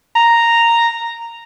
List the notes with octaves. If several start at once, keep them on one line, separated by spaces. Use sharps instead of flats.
A#5